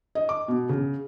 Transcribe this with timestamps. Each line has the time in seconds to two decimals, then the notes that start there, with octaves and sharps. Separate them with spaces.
0.15 D#5
0.29 D6
0.48 B2
0.69 C#3